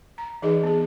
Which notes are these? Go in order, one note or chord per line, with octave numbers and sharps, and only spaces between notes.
A#5
E3 D#4 G#4 B4 D#5
B3 G#4